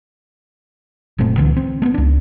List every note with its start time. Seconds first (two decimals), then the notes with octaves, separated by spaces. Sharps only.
1.18 F#1 A#2 A3 C4
1.37 C#2 D3 E3
1.57 C4
1.82 A3 B3
1.94 C#2 D4